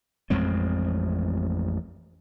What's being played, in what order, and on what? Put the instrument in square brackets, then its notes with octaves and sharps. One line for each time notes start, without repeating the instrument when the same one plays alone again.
[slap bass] A1 F2 G#3 C4